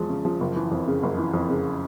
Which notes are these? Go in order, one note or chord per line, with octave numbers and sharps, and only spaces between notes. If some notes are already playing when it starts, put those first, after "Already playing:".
Already playing: E2 F3 G#3
C#3
F3
F#1
E3
F2
C#3
F#1
E3
F2
C#3